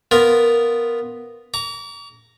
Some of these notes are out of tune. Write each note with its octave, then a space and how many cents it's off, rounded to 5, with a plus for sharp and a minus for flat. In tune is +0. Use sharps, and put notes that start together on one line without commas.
B3 +0 F4 +0 A#4 +0
A#5 +0 D6 -45